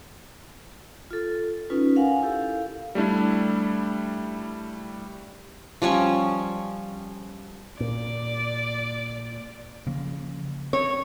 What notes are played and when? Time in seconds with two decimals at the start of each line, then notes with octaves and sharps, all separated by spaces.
1.11 F4 A4
1.70 C#4 D#4 F4 B4
1.96 A#4 F5 F#5 G#5
2.23 E4 G4 A4 F5
2.95 G3 A3 D4 E4
5.82 F3 G3 C#4 C#6
7.80 A#2 D5
9.87 C#3 F3 A#3
10.73 C4 C#5